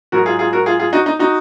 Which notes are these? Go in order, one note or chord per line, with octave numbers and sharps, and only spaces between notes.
G#2 F#3 F#4 A#4
F4 G#4
F4 G#4
F#4 A#4
F4 G#4
F4 G#4
D#4 F#4
D#4
D#4 F#4